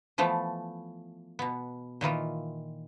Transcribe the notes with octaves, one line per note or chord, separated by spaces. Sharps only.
E3 F3 A3 B3
B2 B3
A#2 D#3 E3 F4